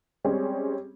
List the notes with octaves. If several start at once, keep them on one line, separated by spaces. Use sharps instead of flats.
G3 G#3 C4 C#4 G#4